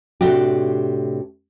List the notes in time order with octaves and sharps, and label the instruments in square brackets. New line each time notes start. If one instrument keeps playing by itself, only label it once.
[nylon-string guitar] A2 C3 D4 F#4 G4